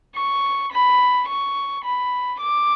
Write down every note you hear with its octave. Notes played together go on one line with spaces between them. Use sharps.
C#6
B5
C#6
B5
D6